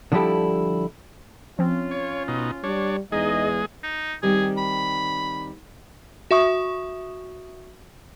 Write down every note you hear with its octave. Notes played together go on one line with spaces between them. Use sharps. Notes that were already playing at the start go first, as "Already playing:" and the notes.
D3 F3 G3 E4 G4 A4
F3 C4 C#4 F4
C#5
B2 D#4
G3 D4 C#5
E2 G#3 D#4 G#4 D#5
D#4
D#3 G3 C4 G#4
B5
F#4 E5 C#6 D#6